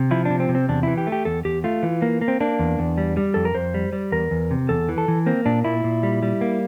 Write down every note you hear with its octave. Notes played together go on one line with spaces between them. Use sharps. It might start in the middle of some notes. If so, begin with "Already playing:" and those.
Already playing: C3
F3 E4
C3 D4
C4
C3
C4
E2 D4
E3 E4
G4
A3
G4
E2 A4
E2 G4
A3 F4
E3
A#3
A#3
C4
A#3 D4
E2
E2
G3
G3
F2 A4
A#4
F2 C5
G3
G3
E2 A#4
E2
C3
E2 A4
E3
A4
E3
A#3 C4
A#2 D4
A#2 E4
A#2
G3
G3
A#3